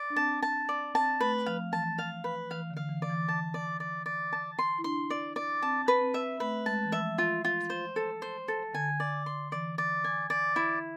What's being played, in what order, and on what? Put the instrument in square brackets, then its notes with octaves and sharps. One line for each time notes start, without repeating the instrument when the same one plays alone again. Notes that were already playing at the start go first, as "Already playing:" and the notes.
Already playing: [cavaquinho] D5
[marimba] D4
[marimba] C4 [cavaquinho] A5
[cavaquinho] A5
D5
[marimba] C4 [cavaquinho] A5
[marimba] A3 [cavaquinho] B4
[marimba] F3 [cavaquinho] F5
[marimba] E3 [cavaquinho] A5
[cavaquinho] F5
B4
[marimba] E3 [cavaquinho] F5
[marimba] D3
[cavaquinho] F5
[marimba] E3
[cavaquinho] D5
[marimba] E3
[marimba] E3 [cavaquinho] A5
[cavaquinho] D5
D5
D5
A5
C6
[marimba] E4
[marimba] D4 [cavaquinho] C6
[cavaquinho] D5
D5
[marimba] C4 [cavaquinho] A5
[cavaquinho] B4
[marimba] C4
[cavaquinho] E5
[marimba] A3 [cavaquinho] B4
[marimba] G#3 [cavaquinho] A5
[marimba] E3
[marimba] F3 [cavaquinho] E5
[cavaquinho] F4
F4
C5
A4
C5
A4
[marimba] D3 [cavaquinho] G#5
[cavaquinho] D5
C6
[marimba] E3 [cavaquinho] D5
[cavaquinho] D5
G#5
D5
E4